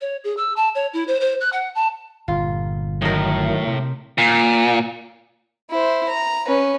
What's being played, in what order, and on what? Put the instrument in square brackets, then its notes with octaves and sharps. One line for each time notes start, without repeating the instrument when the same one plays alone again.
[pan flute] C#5
G#4
E6
A5
C#5
E4
C5
C5
F#6
F#5
A5
[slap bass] G1 A#2 [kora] F4
[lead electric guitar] A2 [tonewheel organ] D#3 F#3 [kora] D#4 A#4
[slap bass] C3
[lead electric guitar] A#2
[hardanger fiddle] E4 C5
A#5
C#4 B4